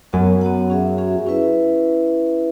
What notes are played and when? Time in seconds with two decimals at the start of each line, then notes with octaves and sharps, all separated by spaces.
0.13 F#2 B3 F#4 C#5 F#5
0.41 B3 F#4 C#5 F#5
0.70 C#4 G#4 E5
0.98 C#4 G#4 E5
1.27 C#4 E4 B4 E5